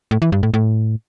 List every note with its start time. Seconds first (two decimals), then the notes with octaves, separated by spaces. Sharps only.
0.11 A2
0.22 E3
0.32 G2
0.43 A2
0.54 A2